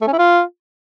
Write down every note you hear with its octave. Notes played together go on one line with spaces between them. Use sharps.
A3
C#4
E4
F4